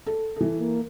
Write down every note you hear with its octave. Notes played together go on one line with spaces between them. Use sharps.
A4
E3 A4
A#3